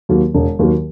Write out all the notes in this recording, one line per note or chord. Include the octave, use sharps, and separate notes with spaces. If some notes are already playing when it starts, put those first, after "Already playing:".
D#2 D#3 F#3 A#3
E1
D#2 D#3 F#3 A#3